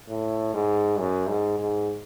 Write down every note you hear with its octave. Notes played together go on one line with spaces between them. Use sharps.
A2
G#2
F#2
G#2
G#2